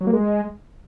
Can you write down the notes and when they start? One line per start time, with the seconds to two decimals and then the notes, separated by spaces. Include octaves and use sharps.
0.01 F#3
0.07 A#3
0.13 G#3